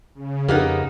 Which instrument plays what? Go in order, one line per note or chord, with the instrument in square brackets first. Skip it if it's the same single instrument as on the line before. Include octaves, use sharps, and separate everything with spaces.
[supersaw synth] C#3
[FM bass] F2 [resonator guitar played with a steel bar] A#3 B3 D#4 [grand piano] G4 B4